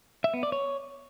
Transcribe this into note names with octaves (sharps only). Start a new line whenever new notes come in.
E5
B3
D5
C#5